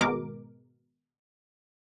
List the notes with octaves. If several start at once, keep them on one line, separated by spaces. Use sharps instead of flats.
G#1 B2 G#3 A#4 D6